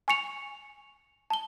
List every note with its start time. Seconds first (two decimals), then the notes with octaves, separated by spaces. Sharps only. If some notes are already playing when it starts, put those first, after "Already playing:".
0.08 G#5 C#6 C#7 F7
1.30 A5 G7